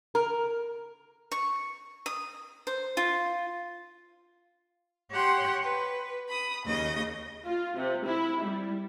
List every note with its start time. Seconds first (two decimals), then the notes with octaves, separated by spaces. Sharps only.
0.15 A#4
1.32 C#6
2.06 D#6
2.67 C5
2.97 F4
5.11 G4 C#5 F#5 G5 C6
5.62 B4
6.28 B5 D#6
6.65 D#2 C#3 D#5
7.46 F4
7.77 C3
8.06 E4
8.43 G3